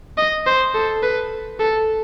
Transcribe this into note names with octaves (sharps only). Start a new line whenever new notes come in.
D#5
C5
A4
B4
A4